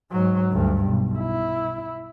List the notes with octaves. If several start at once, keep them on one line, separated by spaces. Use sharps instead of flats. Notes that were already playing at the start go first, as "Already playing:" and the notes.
G#2 F#3
D2 G2
B1
E4